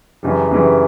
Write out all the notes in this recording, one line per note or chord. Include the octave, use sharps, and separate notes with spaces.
F#2 C#3 E3 G3
F#2 C#3 E3 G3